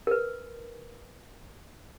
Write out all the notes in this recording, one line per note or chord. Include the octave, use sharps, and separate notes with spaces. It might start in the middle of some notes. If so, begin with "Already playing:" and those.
A#4 B4